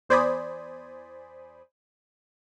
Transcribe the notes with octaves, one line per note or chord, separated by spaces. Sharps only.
E2 C5 D5 G#5 B5 D#6